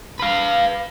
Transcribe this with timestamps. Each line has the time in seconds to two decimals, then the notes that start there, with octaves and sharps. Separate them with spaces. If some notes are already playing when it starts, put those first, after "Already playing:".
0.19 B4 F5